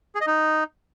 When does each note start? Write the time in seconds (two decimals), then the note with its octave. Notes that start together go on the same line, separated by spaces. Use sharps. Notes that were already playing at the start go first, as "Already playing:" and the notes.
0.15 G#4
0.21 D#5
0.27 D#4